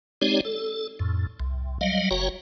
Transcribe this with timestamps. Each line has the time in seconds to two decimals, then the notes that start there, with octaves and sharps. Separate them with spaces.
0.21 G#3 C4 D#4 G4 C#5 D5
0.45 A4
0.99 F2 A2
1.40 C2
1.81 F#3 G3 D#5 F5
2.11 F#1 F#4 C#5 G5 A#5